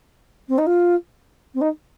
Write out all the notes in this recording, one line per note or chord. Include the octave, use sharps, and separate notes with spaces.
C4
D#4
F4
C4
D#4